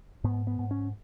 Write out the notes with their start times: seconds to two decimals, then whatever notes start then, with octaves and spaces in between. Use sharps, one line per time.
0.24 G#2 B3
0.47 B3
0.59 G#2
0.71 C#4